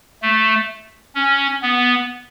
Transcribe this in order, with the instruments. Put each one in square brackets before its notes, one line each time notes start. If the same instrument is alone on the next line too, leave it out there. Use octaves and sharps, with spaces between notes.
[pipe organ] A3
C#4
B3